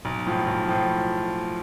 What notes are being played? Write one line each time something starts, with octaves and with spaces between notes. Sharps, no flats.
B1
A2 F3
B1
A2 F3